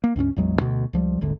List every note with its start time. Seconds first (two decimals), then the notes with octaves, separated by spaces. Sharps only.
0.04 A#3
0.16 C#2 G2 C4 C#4
0.37 A1 E2 F#3 G#3
0.60 D2 B2
0.93 C#2 F3 G3
1.21 D#1 G#1 D3